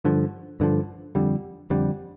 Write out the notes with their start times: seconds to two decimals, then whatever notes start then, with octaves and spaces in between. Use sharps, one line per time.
0.05 G2 D3 F3
0.60 G2 D3 F3
1.15 F2 D3 G3
1.70 F2 D3 G3